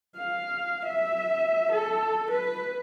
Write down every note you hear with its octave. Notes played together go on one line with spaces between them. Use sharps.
F5
E5
A4
B4